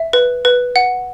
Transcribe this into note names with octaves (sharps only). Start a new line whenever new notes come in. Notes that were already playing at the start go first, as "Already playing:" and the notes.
Already playing: E5
B4
B4
F#5